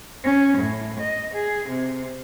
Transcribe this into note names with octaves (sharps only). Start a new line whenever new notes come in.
C#4
A2
D#5
G#4
C3